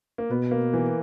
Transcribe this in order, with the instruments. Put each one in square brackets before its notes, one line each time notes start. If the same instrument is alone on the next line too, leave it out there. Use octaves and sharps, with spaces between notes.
[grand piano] A#3
[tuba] B2 [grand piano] B3
[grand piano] A#3
E3